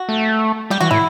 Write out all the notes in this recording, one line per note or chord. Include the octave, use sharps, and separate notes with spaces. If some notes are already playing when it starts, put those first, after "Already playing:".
Already playing: F#4
A3
G3 G4
E3 F#4
A2 E4